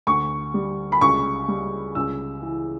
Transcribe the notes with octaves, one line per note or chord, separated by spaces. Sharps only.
D2 C#6
G3
B5
C#2 C#6
G3
C#2 E6
E3